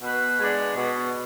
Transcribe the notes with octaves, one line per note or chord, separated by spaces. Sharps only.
B2 B4
G#3 B3 D4
B2